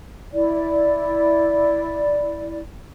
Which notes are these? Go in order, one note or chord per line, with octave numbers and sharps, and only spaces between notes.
E4 D5